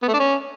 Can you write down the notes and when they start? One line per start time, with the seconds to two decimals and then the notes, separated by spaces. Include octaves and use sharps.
0.02 B3
0.08 A3
0.13 D4
0.19 C#4